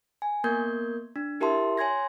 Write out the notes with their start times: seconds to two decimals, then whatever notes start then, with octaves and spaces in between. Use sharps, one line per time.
0.22 G#5
0.44 A#3 B3 A#4 G6 G#6
1.16 D4
1.40 E4 G4 A#4 E5 A5 C6
1.77 C#5 G#5 C6 G#6 A#6